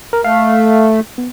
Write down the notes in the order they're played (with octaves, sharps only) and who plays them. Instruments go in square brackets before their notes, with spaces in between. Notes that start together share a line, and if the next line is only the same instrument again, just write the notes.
[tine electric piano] A#4
[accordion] A3 [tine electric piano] F5
[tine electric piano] B3